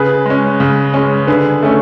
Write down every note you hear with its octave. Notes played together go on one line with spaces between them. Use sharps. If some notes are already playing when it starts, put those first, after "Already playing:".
Already playing: C#3 G#4 B4
G#3 C#4
C#3
G#3 C#4
D3 G#4 B4
A3 C#4